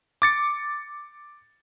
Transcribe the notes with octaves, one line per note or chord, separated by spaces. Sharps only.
D6 A6 C#7